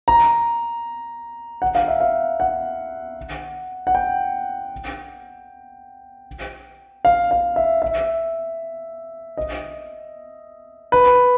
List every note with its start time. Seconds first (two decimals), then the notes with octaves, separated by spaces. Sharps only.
0.08 A#5
1.62 F#5
1.75 F5
1.88 E5
2.00 F5
2.40 F#5
3.87 F#5
3.95 G5
7.05 F5
7.31 F5
7.56 E5
7.82 E5
9.37 D#5
10.92 B4